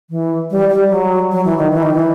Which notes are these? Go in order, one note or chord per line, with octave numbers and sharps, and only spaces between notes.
E3
G3
G3
F#3
F#3
E3
D#3
E3
D#3
E3